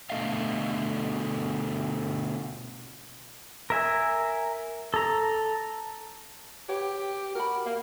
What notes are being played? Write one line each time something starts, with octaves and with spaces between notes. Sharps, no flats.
B2 D3 A3 D#5 F5
A#4 E5 G#5
A4 A#5
G4 B4 C#5 G5
F#4 A#4 B5
A#3 F5